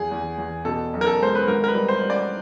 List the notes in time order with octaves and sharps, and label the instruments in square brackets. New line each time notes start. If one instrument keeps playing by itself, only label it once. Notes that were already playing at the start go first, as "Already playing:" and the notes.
Already playing: [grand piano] E2 G#4
E2
E2
B2 A4
B1
A#4
A4
G#3 C5
B4
G#1 A#4
A#4
B4
G3
C5
G3
D5